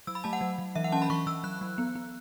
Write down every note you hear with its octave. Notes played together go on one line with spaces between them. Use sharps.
F#3 E6
B5
A3 A5
F#5
F#3
F#3
E3 E5
F#5
C#4 A5
B5
E3 C#6
E3 E6
F#3 F#6
F#3
B3
B3